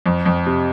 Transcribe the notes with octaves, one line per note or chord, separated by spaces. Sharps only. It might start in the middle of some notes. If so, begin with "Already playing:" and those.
F2
F2
C3